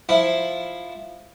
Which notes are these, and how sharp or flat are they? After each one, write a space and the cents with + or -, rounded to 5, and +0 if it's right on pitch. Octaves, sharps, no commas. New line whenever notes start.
F3 +0 E4 +0